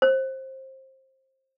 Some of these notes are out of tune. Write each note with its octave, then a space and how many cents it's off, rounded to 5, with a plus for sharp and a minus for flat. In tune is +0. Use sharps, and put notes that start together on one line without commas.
C5 +20